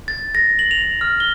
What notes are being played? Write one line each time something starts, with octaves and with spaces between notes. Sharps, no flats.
A6
A#6
F#7
F7
F6
G7